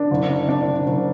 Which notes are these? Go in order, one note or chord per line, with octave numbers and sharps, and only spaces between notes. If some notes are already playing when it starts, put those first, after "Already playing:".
Already playing: D4
F#1
D4
D4
F#1
F#1